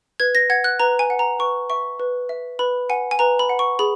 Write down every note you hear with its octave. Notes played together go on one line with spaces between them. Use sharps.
B4 G#6
A#6
F#5 G#6
F#6
B4 A#5
G#5
F#5
A#5
B4 C#6
E5 C#6
B4
E5
B4 B5
F#5 G#5
G#5
B4 A#5
B5
F#5
C#6
G#4 B5